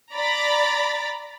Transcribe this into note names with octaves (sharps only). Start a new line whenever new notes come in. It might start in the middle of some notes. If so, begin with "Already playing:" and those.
D5 A#5 B5 A6